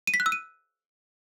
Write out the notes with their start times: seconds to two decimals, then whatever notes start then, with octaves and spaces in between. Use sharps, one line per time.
0.07 D#7
0.14 B6
0.20 F#6
0.26 E6
0.32 D#7